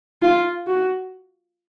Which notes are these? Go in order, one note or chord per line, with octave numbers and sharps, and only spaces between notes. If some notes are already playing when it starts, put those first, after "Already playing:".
F4
F#4